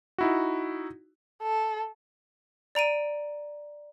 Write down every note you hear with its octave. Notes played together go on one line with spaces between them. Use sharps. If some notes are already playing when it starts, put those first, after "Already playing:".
D#4 E4 F#4
A4
D5 A#5 D7 D#7